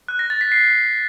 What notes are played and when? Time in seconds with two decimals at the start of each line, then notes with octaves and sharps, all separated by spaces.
0.08 F#6
0.19 A#6
0.30 A6
0.41 B6
0.52 C7